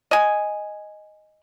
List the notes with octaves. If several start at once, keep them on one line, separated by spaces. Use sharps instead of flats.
D#5 G#5